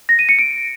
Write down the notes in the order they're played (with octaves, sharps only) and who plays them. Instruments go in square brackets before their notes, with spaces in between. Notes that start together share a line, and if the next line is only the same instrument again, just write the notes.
[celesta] A#6
D#7
C#7
D7